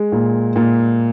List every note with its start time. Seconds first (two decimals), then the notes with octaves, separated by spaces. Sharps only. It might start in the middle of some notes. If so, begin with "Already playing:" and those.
Already playing: G#3
0.12 A#2
0.56 A#2